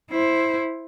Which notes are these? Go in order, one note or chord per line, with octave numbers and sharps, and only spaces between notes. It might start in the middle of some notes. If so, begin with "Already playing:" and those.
E4 C5